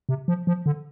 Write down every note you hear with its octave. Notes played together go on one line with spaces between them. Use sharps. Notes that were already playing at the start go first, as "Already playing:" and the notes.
C3
F3
F3
D3